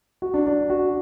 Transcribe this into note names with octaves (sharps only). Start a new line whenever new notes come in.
F#4
D4
D4
F#4